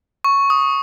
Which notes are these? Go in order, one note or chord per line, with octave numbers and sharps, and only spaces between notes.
C#6
D#6